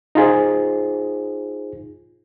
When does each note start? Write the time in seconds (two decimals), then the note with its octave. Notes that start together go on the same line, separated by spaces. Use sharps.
0.15 D#4 F4 G#4 C5